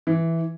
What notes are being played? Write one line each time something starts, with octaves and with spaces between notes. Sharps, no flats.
E3